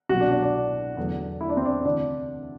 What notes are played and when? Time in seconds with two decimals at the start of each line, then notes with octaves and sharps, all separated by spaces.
0.09 C2 B2 F#3 F#4
0.20 D4
0.31 D4
0.42 D4
0.97 E2 D3 F#3
1.41 E4
1.49 D4
1.57 C4
1.65 D4
1.85 D2 C3 E3 D4